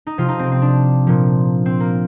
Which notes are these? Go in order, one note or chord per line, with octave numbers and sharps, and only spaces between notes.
D#4
C3 F3 F4
D#4
C4
C4
D4
A#2 F3
C4
A#3